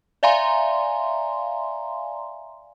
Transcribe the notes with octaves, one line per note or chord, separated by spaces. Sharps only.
D5 E5 F5 G#5 A#5 C6